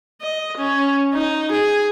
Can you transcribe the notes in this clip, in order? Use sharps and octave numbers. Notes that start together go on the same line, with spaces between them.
D#5
C#4
D#4
G#4